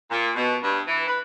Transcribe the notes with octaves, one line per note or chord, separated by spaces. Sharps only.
A#2
B2
G2
E3
B4